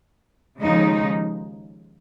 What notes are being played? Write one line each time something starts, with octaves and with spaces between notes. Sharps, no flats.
D#2 C#3 F3 G#3 D#4